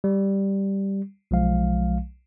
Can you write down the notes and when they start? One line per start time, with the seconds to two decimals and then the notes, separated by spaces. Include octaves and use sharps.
0.04 G3
1.31 B1 F3 G#3 F5